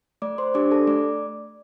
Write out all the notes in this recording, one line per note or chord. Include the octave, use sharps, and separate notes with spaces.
A3 D5 D6
C5 C6
D4 G4 D5 D6
A4 A5
A3 D5 D6